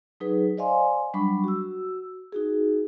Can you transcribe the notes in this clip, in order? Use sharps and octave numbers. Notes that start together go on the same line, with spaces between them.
F#3 D#4 G#4 B4
C5 D5 D#5 F5 G#5 C6
F#3 G3 D4 B5 C#6
F#4 E6
D#4 F#4 G#4